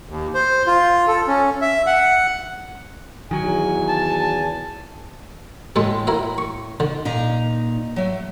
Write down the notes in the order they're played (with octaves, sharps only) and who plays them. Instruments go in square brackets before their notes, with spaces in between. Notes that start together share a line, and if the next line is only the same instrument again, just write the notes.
[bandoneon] D#2
C5
F4
A4
C#4
E5
F#5
[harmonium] E2 G#5 [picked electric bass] D#3 F#3
[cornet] A5
[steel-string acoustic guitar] A2 [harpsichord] G#3 A4
[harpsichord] E4 A#4 E5
C#6
[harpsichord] D3 [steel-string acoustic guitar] D#3
[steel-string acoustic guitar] A#2 D#4 A#5
F#3 A3